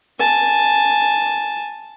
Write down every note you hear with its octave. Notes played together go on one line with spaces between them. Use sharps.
G#5 A5